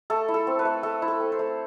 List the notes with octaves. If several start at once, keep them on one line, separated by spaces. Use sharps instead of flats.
A3 A4
E4
A4
C4
B4
A3
A3 A4
E4
A4
C4
C5
A3